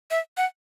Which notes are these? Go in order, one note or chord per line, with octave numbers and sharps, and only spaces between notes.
E5
F#5